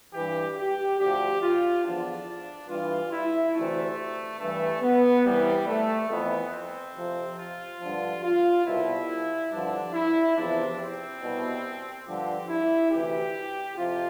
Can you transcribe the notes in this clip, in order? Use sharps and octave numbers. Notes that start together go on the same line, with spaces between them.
G2 E3 G4
G4
D2 D3 F3 G4
F4
E2 D3 F3 D4
G2 E3 F4
E4
D2 C3 E3 A3
G2 E3 A3
B3
C2 C3 E3 G3
A3
F2 E3 B3
C4
F2 C3 F3
F4
G2 D3 F3
F4
C2 B2 E4
G2 D3 F3 D4
E4
E2 C3 F3 D4
C4
C2 B2
G2 D3 F3 G4
E4
D2 C3 E3 G4
F2 C3 F3 F4